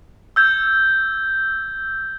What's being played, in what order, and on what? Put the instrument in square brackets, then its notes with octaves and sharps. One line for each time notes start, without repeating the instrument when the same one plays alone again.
[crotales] E6 G6 G#6